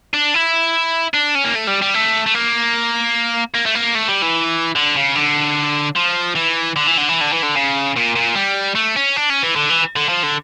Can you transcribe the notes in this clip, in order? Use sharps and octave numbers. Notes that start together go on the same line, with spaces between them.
D4
E4
D4
C#4
A#3
A3
G3
G3
A3
A3
A#3
A#3
A3
A#3
A3
G3
E3
D3
C#3
D3
F3
E3
D3
E3
D3
E3
D3
E3
D3
C#3
A#2
A#2
G3
A3
C#4
D4
C#4
E3
D3
E3
D3
F3
D3